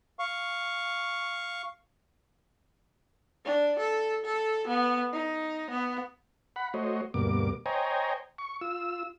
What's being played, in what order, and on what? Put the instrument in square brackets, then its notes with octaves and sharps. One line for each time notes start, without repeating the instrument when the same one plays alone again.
[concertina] F5 C#6
[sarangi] D4
A4
A4
B3
D#4
B3
[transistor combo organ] F#5 B5
A3 F#4 C5 C#5 D#5
D2 G2 B2 A#3 D6
C5 C#5 D#5 G5 G#5 A#5
C#6
F4 E6